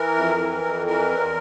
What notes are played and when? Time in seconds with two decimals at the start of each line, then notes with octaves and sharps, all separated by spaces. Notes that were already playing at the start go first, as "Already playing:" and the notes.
Already playing: E3 A#4
0.16 F2
0.39 E3
0.63 F2
0.87 E3 A#4
1.11 E2